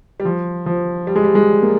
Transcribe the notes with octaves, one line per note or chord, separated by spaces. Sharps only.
G3
F3
F3
G3
G#3
G3
G#3
A#3